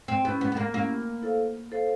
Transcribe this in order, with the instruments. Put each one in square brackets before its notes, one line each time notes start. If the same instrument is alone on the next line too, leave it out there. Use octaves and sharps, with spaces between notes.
[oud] C4
[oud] B3 [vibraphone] C#4 E4 G4
[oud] B3
B3
A#3
[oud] A#3 [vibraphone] C#4 E4 G4
[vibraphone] E4 A4 C5 F5
E4 A4 C5 F5